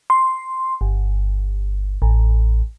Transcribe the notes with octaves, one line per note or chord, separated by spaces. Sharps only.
C6
G1
A1